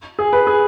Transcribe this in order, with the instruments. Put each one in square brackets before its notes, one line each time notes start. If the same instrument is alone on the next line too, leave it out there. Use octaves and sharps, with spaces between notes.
[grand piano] G#4
B4
G#4